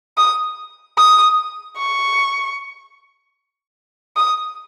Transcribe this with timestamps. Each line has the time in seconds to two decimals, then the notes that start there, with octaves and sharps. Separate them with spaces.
0.17 D#6
0.98 D#6
1.77 C#6
4.17 D#6